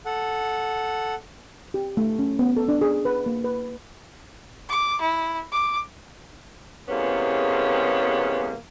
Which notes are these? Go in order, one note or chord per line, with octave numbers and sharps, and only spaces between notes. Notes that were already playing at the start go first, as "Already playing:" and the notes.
A4 F#5
G4
A3
C#4
B3
A4
D4
G#4
B4
A#3
B4
D6
E4
D6
E2 C3 G#3 A#3 B3 C#4